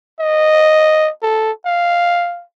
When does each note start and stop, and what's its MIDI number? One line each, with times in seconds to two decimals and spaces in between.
0.20 1.10 75
1.23 1.51 69
1.66 2.43 77